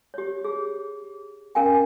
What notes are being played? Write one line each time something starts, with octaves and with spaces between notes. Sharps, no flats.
G4 C#5
G#4
C#4 A#4 F5 G5 G#5